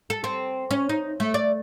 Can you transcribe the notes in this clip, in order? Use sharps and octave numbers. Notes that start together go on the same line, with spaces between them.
A4
C4
C#4
D#4
A3
D5